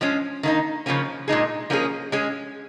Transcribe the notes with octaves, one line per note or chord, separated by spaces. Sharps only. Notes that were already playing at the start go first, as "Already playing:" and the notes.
F3 G#3 C#4
D#3 A#3 D#4
C#3 F3 A#3 C#4
A#2 G#3 D#4 G#4
F3 A#3 C#4 G#4
G#3 C#4 G#4